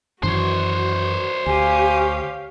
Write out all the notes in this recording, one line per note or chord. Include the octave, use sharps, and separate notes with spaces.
F#2 D#3 E3 F#4 C5 C#5
D2 G4 F5 G#5